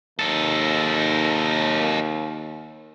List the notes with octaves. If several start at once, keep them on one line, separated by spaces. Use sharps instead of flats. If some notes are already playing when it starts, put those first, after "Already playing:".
D#2 D#4 A4